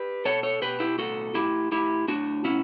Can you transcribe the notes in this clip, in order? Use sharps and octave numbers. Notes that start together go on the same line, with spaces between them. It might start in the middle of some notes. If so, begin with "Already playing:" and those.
Already playing: G4 B4
B2 A4 C#5
A4 C#5
B2 G4 B4
E4 G4
A2 F#4 A4
A2 E4 G4
A2 E4 G4
A2 D4 F#4
B2 C#4 E4